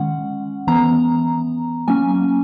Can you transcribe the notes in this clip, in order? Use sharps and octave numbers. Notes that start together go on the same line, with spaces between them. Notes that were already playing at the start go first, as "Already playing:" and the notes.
Already playing: D#3 G#3 C#4 F#5
E3 B3 A#5
F#3 A#3 C#4 G#5